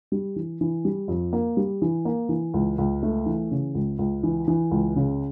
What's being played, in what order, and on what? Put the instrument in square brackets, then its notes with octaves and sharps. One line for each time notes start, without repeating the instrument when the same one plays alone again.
[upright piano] G3
E3
E3
G3
F2
A#3
G3
E3
A#3
E3
C#2
C#2
A3
E3
C#3
C#2
C#2
E3
E3
C#2
C#3